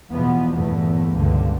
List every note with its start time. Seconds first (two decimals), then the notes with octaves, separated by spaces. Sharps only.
0.12 E2 B2 F3 B3
0.54 G1 E2 A#2 A3
1.14 C#2 G2 A#2 D3